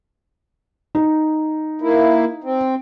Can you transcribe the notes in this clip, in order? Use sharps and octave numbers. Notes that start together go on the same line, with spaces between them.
D#4
A#3 E4
C4